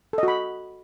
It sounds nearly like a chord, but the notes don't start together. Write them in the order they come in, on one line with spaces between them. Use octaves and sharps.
A4 D#5 F#4 B5